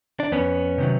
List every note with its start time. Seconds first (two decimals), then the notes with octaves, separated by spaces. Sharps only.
0.20 D4
0.32 F2 B3 C#4
0.78 C3 D#3 F#3